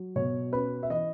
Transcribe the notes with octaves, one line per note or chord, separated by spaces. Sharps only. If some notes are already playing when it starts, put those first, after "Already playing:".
Already playing: F#3
B2 C#5
C#4 B4
E5
E3 D#5